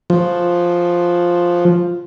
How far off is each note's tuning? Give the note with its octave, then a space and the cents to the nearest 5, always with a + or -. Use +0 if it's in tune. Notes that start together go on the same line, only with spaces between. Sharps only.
F3 +0